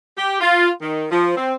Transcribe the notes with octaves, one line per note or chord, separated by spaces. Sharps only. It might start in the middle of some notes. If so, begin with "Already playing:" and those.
G4
F4
D#3
F3
C4